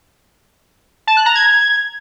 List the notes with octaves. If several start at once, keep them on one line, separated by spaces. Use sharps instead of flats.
A5
F#6
A#5
G#6